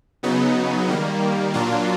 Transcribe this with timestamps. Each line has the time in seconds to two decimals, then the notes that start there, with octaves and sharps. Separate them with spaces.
0.23 C#3 F#3 B3 D#4
0.88 D#3 G3 A#3
1.53 A#2 F#3 A#3 D4 F4